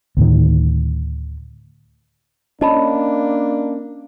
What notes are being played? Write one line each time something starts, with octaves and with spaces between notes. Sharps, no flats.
D2 A2 D#3
A#3 C#4 D4 D#5 A5 B5